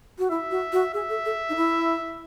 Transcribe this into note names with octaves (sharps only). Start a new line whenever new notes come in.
F#4
E4 E5
F#4
F#4
G#4 E5
A4
A4
D#4
E4